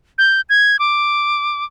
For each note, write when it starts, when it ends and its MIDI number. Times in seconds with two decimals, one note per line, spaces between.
0.18 0.41 91
0.49 0.79 92
0.79 1.65 86